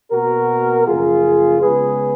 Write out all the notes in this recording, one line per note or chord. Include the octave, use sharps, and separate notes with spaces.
B2 A#3 F#4 A#4
F#2 C#3 F3 A#3 F4 G#4
C#3 G#3 B3 G#4 B4